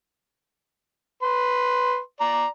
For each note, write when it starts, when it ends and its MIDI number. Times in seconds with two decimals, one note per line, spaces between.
1.22 1.98 71
1.22 1.98 84
2.20 2.46 74
2.20 2.46 82